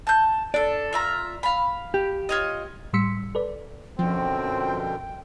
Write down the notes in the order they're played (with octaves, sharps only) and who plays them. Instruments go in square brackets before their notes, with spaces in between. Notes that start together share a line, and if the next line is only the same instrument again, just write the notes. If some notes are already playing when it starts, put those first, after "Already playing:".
[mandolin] A5 G6
[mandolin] D4 A4 [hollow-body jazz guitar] D5
[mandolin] F4 E5 A#5
F5 B5
[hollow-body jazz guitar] G4
[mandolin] F4 C#5 D#5
[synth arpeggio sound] A2 G3 C6 E6 B6 C#7
A4 B4 D5
[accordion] F#2 B2 D3 [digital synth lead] F3 [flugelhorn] C4 [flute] G5